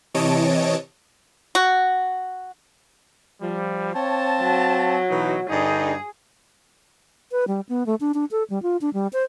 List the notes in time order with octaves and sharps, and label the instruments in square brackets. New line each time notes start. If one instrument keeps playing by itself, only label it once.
[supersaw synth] C3 E3 C#5 D#5 A5 D7
[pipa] F#4
[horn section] F3 G3
[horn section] C4 F5 A5 [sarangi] C#5
[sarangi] F#3
[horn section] B2 E3 D#4
[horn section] G2 D3 D#4 [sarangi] G#4
[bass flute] B4
G3
B3
A3
D4
D4
A4
G3
F4
D4
G3
C5